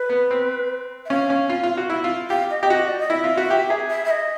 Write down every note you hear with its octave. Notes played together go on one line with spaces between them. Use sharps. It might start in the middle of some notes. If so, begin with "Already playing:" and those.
Already playing: B4
B3
C4
E5
C#4 F5
C#4
F4
F4
F#4
E4
F4
G4 F5
D#5
G4
F#4
D5
D#5
E4 E5
F4
F#4
G4
G#4
E5
E5
D#5